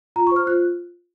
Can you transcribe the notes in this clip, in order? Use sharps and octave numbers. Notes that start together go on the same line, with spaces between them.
F4 A#5
C#6
C5 F6
F4 F#6